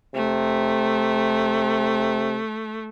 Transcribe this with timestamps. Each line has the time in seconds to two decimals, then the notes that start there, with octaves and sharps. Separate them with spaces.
0.15 C3 A3